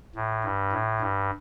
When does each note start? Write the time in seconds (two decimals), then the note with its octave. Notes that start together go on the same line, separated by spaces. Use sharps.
0.16 A2
0.44 G2
0.73 A2
1.01 G2